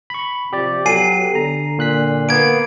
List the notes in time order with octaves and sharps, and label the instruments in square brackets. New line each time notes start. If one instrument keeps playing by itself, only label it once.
[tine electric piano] B5 C#6
[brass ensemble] C3 F3 [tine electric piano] G4 D5
[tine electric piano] F#3 [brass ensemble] B3 G4 A4 [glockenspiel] G#5 C7 D#7
[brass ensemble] D3 [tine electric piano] A#5
[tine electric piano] A#2 F#6 B6
[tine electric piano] A#3 B3 [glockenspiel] G#6 D7